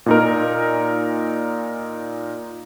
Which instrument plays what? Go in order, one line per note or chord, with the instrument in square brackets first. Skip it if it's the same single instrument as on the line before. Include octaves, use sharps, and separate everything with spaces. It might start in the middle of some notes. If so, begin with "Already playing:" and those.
[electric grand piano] A#2 D#4 A#4